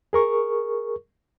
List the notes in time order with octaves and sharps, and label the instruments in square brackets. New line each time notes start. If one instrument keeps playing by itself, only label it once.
[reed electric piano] G#4 A#4 C#6